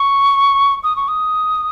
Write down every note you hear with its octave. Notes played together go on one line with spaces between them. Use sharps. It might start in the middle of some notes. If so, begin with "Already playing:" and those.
Already playing: C#6
D#6
C#6
D#6